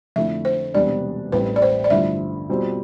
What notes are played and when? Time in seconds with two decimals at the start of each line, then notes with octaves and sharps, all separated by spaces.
0.16 F2 D3 A3 E4 E5
0.45 C5
0.74 E1 E2 C3 G3 D4 D5
1.32 A1 A2 G3 C4 E4 B4
1.56 D5
1.62 C5
1.84 D5
1.90 G2 D3 F3 A3 E4 E5
2.49 B2 G3 C4 F4